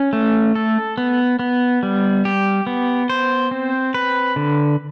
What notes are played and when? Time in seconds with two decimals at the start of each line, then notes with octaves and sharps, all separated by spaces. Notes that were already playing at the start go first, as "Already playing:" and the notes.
Already playing: C#4
0.13 A3
0.55 A4
0.98 B3
1.39 B3
1.83 G3
2.25 G4
2.67 B3
3.09 C5
3.51 C4
3.94 B4
4.36 D3